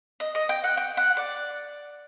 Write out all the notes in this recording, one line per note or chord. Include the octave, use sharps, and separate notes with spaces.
D#5
D#5
G5
F#5
G5
F#5
D5